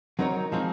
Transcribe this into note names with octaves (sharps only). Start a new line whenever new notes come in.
F#3 C4 D#4 A#4 C#5
F3 G#3 C4 D#4